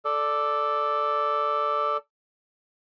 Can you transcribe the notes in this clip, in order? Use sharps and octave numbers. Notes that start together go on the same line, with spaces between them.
A4 D5